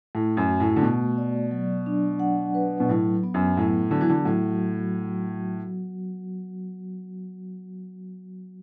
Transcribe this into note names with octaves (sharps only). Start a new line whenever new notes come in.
A2 A3
F#2
F#4
A2
D3
B2 A3
D5
F#3
D4
F#5
B4
B2
A2 F#3
B3
F#2
A2 F#3
D3 F#4
E3
D3
A2 F#3